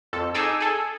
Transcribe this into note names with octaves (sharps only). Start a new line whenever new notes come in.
F2 A4
D#4 G#4 A4 D6 E6
G#4 A4